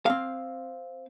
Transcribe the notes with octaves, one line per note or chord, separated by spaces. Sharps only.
C4 F5